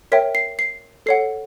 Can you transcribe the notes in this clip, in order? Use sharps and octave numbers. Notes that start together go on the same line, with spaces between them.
A#4 C#5 E5 G5 B6
C7
C7
A4 C#5 F#5 C7